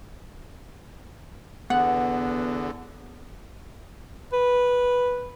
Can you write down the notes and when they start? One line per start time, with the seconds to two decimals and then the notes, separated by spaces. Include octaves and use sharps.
1.70 E2 D3 B3 F#5
4.33 B4